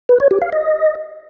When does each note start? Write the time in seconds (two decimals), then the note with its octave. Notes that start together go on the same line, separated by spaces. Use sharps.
0.09 B4
0.20 C#5
0.31 G4
0.42 F5
0.52 D#5